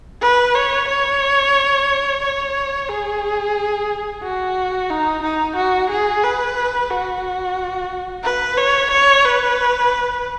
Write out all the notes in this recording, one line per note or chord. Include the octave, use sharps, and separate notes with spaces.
B4
C#5
C#5
C#5
G#4
F#4
D#4
D#4
F#4
G#4
B4
F#4
B4
C#5
C#5
B4